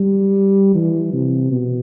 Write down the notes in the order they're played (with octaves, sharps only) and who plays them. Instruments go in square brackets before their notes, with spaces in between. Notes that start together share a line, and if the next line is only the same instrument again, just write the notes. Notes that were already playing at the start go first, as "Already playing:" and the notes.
Already playing: [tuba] G3
E3
C3
B2